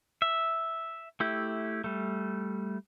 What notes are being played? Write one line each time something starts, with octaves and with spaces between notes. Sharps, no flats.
E5
A3 E4 G4
G3 A3